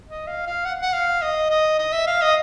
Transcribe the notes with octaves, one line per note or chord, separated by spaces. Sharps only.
D#5
F5
F5
F#5
F#5
F5
D#5
D#5
D#5
E5
F5
D#5